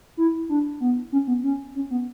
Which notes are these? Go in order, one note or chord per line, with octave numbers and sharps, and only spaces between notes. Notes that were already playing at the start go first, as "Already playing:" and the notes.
E4
D4
B3
C#4
B3
C#4
C#4
B3